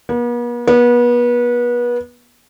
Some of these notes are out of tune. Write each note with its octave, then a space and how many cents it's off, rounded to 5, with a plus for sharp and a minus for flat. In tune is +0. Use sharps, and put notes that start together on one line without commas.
B3 -45
B3 -30